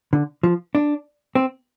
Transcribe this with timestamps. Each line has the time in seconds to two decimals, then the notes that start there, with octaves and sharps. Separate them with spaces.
0.13 D3
0.43 F3
0.75 D4
1.35 C4